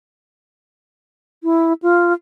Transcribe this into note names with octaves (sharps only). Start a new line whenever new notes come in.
E4
F4